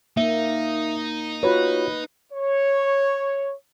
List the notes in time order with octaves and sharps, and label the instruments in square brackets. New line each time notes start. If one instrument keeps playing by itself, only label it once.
[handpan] A#3 [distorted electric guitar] D#4 [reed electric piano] E5
[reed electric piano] F4 F#4 C#5 [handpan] B4
[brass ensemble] C#5